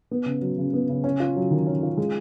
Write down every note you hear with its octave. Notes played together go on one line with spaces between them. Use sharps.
B3
C#3
F#3
C#3
B3
C#3
C#4
F4
F#3
D#3
C#4
F4
G#3